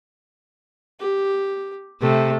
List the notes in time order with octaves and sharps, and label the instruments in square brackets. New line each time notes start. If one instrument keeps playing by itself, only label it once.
[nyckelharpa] G4
[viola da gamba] C3 [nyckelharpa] A3